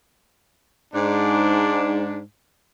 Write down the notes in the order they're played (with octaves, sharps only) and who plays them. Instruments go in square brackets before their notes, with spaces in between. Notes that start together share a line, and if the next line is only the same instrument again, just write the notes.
[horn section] G#2 D4